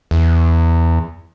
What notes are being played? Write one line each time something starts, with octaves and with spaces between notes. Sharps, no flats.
E2